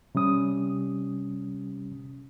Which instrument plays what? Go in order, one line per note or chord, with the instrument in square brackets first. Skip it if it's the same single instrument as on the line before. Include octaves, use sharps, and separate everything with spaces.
[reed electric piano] C3 G3 C#4 D#6